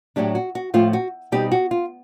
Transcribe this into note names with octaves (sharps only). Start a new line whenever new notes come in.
A2 F#3 A3 D4 G4
F#4
F#4
A2 F3 A3 C4 F4
F#4
B2 G3 C4 D#4 G4
F#4
F4